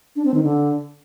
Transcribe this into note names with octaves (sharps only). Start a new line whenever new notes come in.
D4
C4
D#3
D3